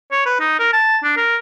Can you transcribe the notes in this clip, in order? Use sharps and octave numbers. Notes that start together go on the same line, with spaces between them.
C#5
B4
D#4
A#4
A5
D4
A#4